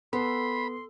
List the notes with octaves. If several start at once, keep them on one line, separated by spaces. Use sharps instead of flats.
B3 A4 B5 C6